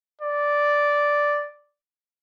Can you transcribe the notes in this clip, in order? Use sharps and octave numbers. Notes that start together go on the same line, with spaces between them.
D5